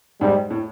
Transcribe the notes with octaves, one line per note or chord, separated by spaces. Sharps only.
G#2 G3
A2